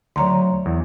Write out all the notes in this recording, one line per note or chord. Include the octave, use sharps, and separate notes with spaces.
D2 F#3 C#5 A#5 C6
E2